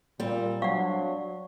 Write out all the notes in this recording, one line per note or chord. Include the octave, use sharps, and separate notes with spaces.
A#2 G3 C4
F#3 D4 F5 F#5 C#6